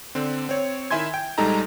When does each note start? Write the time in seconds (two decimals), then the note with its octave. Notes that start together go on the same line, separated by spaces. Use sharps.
0.15 D3 C4
0.49 C4 C#5
0.91 D#3 E4 E5 G#5 C6 G#6
1.14 G5
1.38 A#1 G3 G#3 D#4 A4 A#5